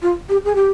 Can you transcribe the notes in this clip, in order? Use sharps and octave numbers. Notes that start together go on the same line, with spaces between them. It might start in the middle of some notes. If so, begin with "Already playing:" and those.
F4
G4
G#4
G4